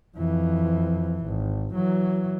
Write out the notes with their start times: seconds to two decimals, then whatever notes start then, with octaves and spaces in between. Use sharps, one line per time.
0.17 F2 E3
1.26 G#1
1.72 E3 F#3